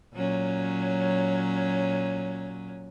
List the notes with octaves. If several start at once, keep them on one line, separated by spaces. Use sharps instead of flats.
A#2 F#3 C#4